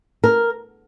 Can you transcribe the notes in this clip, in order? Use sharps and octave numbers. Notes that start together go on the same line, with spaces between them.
A#4